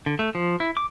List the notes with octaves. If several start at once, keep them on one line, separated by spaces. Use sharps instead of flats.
D3
A3
F3
E4
D6